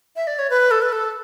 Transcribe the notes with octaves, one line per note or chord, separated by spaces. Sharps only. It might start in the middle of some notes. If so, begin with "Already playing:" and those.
E5
D5
C#5
B4
A4
B4
A4